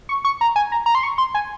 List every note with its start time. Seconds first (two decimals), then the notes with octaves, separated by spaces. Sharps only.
0.09 C#6
0.25 C#6
0.41 A#5
0.56 G#5
0.72 A#5
0.86 A#5
0.95 C6
1.03 C#6
1.18 C6
1.35 G#5